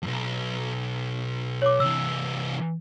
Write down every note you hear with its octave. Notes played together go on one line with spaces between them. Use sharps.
B1 F2
C#5 D6
C3 E3 E6